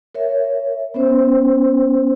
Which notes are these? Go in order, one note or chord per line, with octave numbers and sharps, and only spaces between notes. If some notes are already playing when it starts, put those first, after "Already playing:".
A#4 C#5 E5
B3 C#4 C5